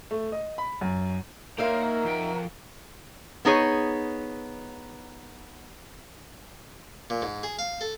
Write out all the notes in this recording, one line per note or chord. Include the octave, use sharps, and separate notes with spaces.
A3
D#5
B5
F#2
A#3 D#4 A#4 C#5 E5 F5 C6
F#5 A#5
F3 G5
B3 D#4 G#4 C#5
A#2
G#2
G#4
F5
A4